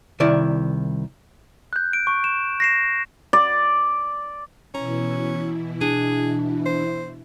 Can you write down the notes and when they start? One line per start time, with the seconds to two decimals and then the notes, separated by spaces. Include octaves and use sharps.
0.20 C2 D#3 E4 D5
1.73 F#6 G6
1.93 D7
2.07 C#6
2.24 E7
2.60 A#6 C7 E7
3.33 D5
4.75 B2 E3 C#4 E4 A#5
5.81 D4 G#4
6.66 C5